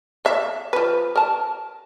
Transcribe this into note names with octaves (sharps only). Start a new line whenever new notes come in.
A#3 E5
F3 B4
A#4 A5